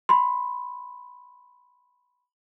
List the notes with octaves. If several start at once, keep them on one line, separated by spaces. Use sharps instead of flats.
B5 C6